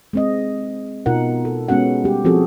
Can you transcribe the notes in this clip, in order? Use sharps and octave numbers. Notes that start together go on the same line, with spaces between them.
G#3 C4 D#5
B2 D#4 F4 A#4 F#5
A4
G#3 B3 C#4 F#4 F#5
G3 G4
F3 C4 F#4 G#4 A4